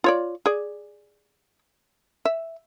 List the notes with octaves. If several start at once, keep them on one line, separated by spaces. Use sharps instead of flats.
F4 C#5 D5
G#4 D5
E5